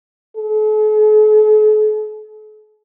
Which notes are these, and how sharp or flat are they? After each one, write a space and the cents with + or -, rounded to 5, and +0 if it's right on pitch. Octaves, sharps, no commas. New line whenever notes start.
A4 -45